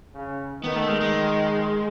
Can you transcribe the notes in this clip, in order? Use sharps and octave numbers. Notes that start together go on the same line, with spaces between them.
C#3
D#3 B3
A3
G#3
G#3